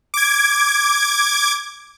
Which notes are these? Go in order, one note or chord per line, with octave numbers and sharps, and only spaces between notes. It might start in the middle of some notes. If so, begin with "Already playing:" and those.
D6 G#6